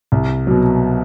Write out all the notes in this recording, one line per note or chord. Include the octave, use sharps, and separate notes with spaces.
C2
B2 F#3